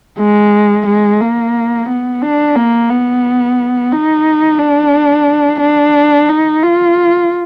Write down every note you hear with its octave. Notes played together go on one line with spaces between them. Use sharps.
G#3
G#3
A#3
B3
D4
A#3
B3
D#4
D4
D4
D#4
F4